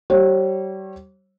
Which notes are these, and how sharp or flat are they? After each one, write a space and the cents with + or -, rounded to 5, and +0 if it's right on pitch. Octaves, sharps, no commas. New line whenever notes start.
G3 -35 C#5 -40